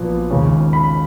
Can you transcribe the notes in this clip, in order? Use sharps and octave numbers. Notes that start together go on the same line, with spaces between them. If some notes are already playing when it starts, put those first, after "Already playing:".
Already playing: A#1 A#2 F#3 B3
D#2 C#3 G#3 C#4
B5